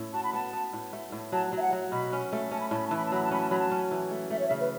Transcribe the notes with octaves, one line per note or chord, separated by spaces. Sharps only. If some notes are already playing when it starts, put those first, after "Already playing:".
Already playing: A2 C#4 E4
F#4 A5
B5
B3 A5
B3
A2
A3
A2
F#3 A5
F#3 E5
F#5
F#3
B2 B5
C#4
A3
C#4 A5
B5
A2 A5
B5
E3 A5
B5
A5
F#3 B5
A5
C#4 B5
A5
F#3 B5
A5
C#4
E3
A3
A3 E5
C#5
E5
C#3
B4